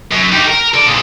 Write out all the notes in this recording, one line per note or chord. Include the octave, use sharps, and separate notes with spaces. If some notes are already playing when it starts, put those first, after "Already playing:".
F#2
D#4 G4
A#4
A4 D5
A#2 G#3